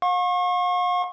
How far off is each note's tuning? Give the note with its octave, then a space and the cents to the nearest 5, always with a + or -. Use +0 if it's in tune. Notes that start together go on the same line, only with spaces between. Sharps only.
F5 +45 C#6 -35